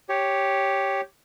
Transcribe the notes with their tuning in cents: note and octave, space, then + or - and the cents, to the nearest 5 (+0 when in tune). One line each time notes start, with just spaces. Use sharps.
G4 +0 C#5 +0